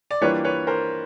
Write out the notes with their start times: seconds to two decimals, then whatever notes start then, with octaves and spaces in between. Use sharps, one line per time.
0.11 D5
0.21 E3 G3 A#3 D4 F4 B4 C#5
0.45 B4 C#5
0.67 A#4 C5